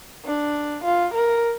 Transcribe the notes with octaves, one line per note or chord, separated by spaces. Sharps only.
D4
F4
A#4